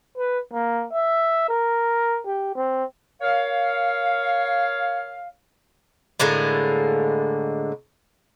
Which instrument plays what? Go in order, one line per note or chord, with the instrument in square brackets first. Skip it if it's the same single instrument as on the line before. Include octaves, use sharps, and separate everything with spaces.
[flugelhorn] B4
A#3
E5
A#4
G4
C4
[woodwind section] A#4 C#5 F5
[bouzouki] A2 D3 G#3 A#3